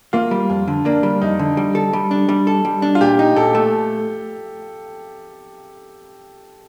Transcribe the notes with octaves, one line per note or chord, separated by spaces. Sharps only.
A#3 F4
G3
F2
D3
A#3 D4
G3
F2 D#4
D3
G3
A4
G3
D4
G3
A4
G3
D4
F4
A#2 G4
D#4
A#2 A4
A3